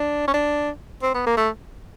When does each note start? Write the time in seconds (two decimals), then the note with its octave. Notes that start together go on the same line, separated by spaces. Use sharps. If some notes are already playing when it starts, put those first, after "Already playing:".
Already playing: D4
0.27 C#4
0.33 D4
1.02 C4
1.14 B3
1.26 A#3
1.37 A3